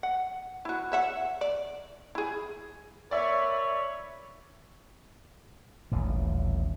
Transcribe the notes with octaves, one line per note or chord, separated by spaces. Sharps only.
F#5
E4 F#4
C#5 E5 F#5
D5
E4 G#4
A#4 B4 C#5 D5 E5
D#1 A1 D3